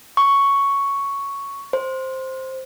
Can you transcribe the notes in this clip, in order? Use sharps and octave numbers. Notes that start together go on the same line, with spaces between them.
C#6
C5